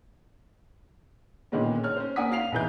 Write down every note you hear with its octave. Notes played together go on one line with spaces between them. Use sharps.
A#2 D3 D#3 G#3 B3 C#4
C#5 F6
C#4 C5
A#3 D4 F#5 G#5 D#6 B6
C#4 F#4 F5 C7 F7
B1 E2 E3 G6